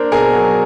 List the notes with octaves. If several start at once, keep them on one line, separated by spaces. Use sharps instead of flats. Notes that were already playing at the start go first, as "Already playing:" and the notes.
Already playing: A#3 D4 A#4 C5
B2 G#4 A#4
F#3